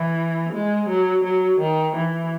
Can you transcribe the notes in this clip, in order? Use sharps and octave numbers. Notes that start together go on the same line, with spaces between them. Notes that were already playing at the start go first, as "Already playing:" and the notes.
Already playing: E3
G#3
F#3
F#3
D#3
E3